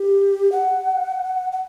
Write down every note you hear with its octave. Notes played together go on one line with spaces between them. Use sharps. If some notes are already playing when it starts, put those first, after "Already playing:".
Already playing: G4
F#5
F#5